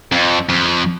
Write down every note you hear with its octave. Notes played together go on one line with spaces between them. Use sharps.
F2
F2